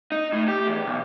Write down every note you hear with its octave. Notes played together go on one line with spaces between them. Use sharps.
D#4
A2
G4
E2
B1